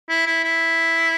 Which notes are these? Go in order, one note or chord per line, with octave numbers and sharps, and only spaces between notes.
E4
E4
E4